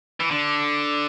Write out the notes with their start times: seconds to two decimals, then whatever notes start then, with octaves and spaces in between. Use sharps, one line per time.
0.20 E3
0.31 D3